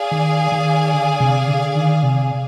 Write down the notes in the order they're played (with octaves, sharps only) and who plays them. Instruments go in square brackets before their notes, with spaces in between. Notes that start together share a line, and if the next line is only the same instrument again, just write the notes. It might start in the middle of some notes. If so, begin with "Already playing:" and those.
Already playing: [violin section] G#4 D5 F5 G#5
[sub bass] D#3
D#3
D3
C3
D3
D#3
C3